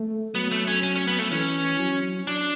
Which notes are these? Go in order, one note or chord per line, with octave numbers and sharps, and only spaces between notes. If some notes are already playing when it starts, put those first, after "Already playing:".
Already playing: A3
F#3 B3
A3
C#4
C#4
C#4
B3
A3
E3 C#4
F#3
D4